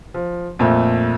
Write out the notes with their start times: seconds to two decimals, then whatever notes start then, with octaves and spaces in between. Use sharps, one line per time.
0.14 F3
0.59 F2 A#2 A3